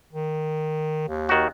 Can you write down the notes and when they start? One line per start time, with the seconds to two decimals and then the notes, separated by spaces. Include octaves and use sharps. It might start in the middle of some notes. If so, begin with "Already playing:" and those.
0.13 D#3
1.08 D#2
1.29 D#3 F#4